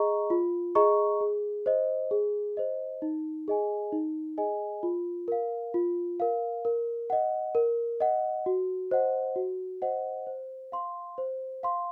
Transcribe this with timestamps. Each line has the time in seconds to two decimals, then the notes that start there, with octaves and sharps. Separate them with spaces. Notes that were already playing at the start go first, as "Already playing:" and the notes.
Already playing: G#4 D#5 A#5 C#6
0.30 F4
0.75 G#4 D#5 A#5 C#6
1.21 G#4
1.66 C5 D#5
2.11 G#4
2.57 C5 D#5
3.02 D#4
3.48 G#4 D#5 G#5
3.92 D#4
4.38 G#4 D#5 G#5
4.83 F4
5.28 A#4 F5
5.74 F4
6.20 A#4 F5
6.65 A#4
7.10 D#5 F#5
7.55 A#4
8.00 D#5 F#5
8.46 F#4
8.91 C5 D#5 F#5
9.36 F#4
9.82 C5 D#5 F#5
10.27 C5
10.72 F5 C6
11.18 C5
11.63 F5 C6